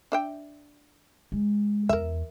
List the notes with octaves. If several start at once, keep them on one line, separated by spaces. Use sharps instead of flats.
D4 E5 G5
G#3
E2 A#4 E5